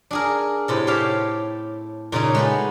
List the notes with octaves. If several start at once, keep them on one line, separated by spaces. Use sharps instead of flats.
D4 G#4 A#4
A2 C3 A4
G4 C#5 E5 F5 G5
A#2 C#3 D#4 C#5
G#3 A3 B3